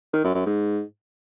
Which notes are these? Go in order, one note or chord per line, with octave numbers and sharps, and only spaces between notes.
D#3
F#2
F#2
G#2